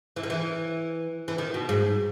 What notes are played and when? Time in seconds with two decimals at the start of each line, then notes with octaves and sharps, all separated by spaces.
0.16 E3
0.23 D#3
0.30 E3
1.28 E3
1.38 D#3
1.54 B2
1.69 G#2